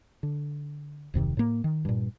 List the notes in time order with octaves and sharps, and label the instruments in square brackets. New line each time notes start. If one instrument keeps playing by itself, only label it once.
[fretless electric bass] D3
D1 F2 C3 D#3
A2 A#3
D#3
G2 A#2